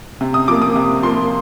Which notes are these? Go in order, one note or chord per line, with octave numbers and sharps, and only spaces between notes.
C3
D#6
F3 A#3 D6
D#6
C3
F3 A#3 C6